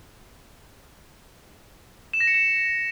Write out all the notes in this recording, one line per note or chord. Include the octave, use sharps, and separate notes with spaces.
E7
A#6
C#7
E7